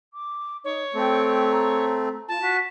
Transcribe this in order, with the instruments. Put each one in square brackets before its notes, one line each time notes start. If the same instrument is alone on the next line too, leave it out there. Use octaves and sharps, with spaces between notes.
[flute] D6
[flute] D#4 [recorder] C#5
[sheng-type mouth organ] A3 C4 [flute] G5
[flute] A#5
[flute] F4 [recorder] A5
[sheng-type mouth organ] F#4 [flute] B6